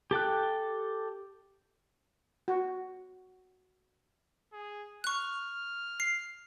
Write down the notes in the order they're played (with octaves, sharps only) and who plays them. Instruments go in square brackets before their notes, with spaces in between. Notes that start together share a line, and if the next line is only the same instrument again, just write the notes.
[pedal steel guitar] G4 A4 G5 F#6
[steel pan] F#4
[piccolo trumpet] G#4
[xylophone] C#6 F#6 [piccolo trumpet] F6
[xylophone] C7